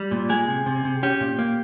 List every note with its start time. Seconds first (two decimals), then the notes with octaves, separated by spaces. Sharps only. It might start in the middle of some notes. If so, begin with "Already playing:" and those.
Already playing: G3
0.11 A#2
0.29 G#3 G#4
0.48 C3
0.66 C3
0.85 C3
1.03 C#4 G4
1.21 A#2
1.39 A#3